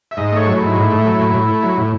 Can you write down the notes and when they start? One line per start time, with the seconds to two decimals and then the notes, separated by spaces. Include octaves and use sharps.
0.11 E5
0.17 G#2 D#5
0.32 A3 C#5
0.46 F#3
0.56 G#2 E4
0.76 A2
0.90 A3
1.05 F#3
1.19 A2
1.34 A2
1.48 A3
1.63 F#3
1.77 A2